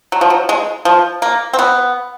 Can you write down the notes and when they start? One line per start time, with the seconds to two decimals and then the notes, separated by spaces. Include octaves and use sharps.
0.12 F#3
0.21 F3
0.30 F#3
0.49 G#3
0.85 F3
1.22 A#3
1.53 C4
1.59 B3